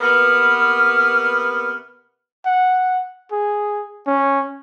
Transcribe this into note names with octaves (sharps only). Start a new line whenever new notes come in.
C3 A#3 B3 F6
F#5
G#4
C#4